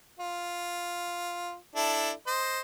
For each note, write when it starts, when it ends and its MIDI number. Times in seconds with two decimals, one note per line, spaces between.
0.19 1.55 65
1.76 2.11 62
1.76 2.11 64
1.76 2.11 69
2.27 2.60 72
2.27 2.60 75